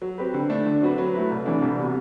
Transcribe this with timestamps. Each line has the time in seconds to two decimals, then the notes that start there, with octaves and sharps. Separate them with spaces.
0.02 F#3
0.18 C4 G4 B4
0.34 D3
0.50 A3 D4
0.66 D3
0.82 F#3 C4 F#4 B4
0.98 F#3
1.14 A3 E4 B4
1.30 C2
1.46 C3 E3 A3 D4
1.62 C2
1.78 C3 G3 B3 F#4